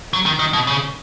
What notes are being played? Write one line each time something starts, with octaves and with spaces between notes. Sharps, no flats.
F#3
D#3
D#3
B2
C#3